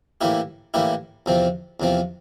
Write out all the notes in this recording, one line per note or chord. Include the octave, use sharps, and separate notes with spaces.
A2 E3 A#3 E4 G4
A2 E3 A#3 E4 G4
E2 C3 F3 C4
E2 C3 F3 C4